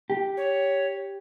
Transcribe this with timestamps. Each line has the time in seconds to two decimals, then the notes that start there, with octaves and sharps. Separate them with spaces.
0.10 G4
0.37 C#5